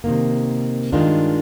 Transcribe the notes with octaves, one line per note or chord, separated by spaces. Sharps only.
C3 D#3 A#3
G2 D#3 G#3 D4 F4